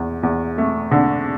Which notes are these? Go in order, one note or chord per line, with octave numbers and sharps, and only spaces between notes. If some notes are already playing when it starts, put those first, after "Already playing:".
Already playing: E2
E2
A3
D3